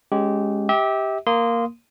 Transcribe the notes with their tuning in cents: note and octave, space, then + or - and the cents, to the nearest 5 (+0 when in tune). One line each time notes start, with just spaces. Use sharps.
G#3 +0 C#4 +0 G4 -20
G4 +0 E5 -35
A#3 +0 C6 -20 D#6 +0